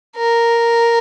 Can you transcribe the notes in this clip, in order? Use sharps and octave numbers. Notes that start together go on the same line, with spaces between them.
A#4